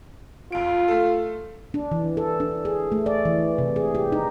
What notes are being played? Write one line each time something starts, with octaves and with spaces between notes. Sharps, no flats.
F2 F4 D7
A3 A4
D4
E3
A4
D4
G#4
A3
D5
E3
C3
G#4
G4
D#4